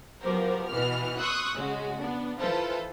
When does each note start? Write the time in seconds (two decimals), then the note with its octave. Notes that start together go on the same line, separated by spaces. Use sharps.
0.21 F3 F#3 B3 G4 A#4 C5
0.69 B2 E3 B3 B4 F6
1.17 C6 C#6 D#6 E6 F#6
1.56 C#3 G#3 C#4 F#4
2.00 B3 D4
2.39 E3 F4 A4 B4 C5